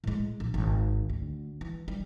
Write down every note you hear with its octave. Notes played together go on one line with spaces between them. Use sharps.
A2 G#3
A#1
G#1
D2
E3
G3